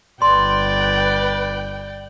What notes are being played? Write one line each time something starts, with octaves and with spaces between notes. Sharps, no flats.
G1 B4 D5 G5 C6